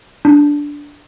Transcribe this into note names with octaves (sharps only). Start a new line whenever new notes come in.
D4